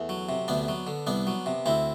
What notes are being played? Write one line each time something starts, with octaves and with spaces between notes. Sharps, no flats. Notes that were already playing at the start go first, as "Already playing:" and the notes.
Already playing: E2 A3
F#3
C3
D2 B3 D4
F#3
D3
C2 B3 D4
F#3
C3
D2 C4 E4